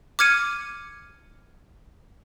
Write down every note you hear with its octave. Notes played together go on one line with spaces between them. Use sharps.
D6 F6 G#6 C#7 D#7